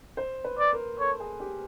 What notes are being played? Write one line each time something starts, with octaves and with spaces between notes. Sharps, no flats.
C5
B4
D5
A#4
A4 C#5
G#4
G4